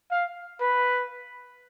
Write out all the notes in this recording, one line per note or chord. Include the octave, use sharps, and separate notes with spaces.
F5
B4